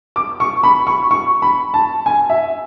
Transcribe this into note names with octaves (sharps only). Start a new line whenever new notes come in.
D6
C#6
B5
C#6
C#6
B5
A5
G#5
E5